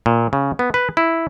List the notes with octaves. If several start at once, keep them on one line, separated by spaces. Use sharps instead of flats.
A#2
C#3
B3
B4
E4